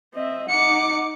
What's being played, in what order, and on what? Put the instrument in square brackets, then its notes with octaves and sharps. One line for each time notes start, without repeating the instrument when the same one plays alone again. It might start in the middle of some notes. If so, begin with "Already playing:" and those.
[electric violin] C4 [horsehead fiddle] D#5 E5
[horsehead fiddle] D#4 F#5 [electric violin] D6 C#7